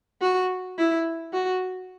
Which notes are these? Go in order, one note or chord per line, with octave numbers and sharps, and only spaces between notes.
F#4
E4
F#4